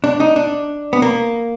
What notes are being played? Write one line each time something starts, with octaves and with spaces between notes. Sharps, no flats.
D4
D#4
D4
B3
A#3